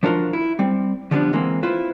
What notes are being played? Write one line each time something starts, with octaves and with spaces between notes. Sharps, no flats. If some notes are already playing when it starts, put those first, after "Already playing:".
F3 D4 F#4 A#4 F5 C6
E4
G3 C4
D3 F3 G3 B3 C#4 D4
E3 G#3 A#3 C4
E4 F4 B4 C5